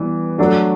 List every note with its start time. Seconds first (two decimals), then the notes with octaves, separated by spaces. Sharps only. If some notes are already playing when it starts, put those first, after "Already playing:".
Already playing: E3 G3 B3
0.38 F#3 A3 D4 F#4